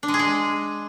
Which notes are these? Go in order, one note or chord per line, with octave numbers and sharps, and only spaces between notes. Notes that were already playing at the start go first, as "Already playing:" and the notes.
D4
G#3
G#4
G#3